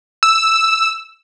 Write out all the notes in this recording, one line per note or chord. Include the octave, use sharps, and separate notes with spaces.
E6